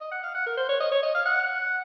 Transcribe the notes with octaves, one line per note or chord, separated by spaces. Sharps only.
D#5
F#5
F5
F#5
A#4
C5
C#5
D#5
C#5
D#5
F5
F#5